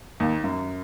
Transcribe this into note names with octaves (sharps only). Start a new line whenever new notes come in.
D#2
F#2